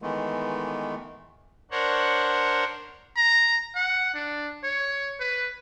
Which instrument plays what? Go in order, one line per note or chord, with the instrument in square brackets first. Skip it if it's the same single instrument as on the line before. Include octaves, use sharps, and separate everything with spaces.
[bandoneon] D#3 E3 G#3 A3 B3
[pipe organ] D4 A#4 C5 C#5 F#5
[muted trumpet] A#5
F#5
D4
C#5
B4